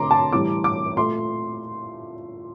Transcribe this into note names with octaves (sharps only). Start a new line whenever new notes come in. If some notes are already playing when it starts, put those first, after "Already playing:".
Already playing: D3 A3 A#5 C6 D6
A5
A2 E3 G3 D6
D6
A#2 A3 C6